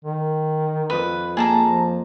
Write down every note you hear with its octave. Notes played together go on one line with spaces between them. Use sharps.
D#3
F2 B4 D#6
A#3 G#4 A5 A#5
F3